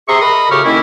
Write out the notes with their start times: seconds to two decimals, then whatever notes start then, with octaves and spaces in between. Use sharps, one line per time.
0.08 C3 G#4 E5 A#5 C6 C#6
0.21 A#4 D#5 B5
0.50 A2 C#3 F#4 G4 C#6 F6
0.65 D#3 A#3 C#4 E4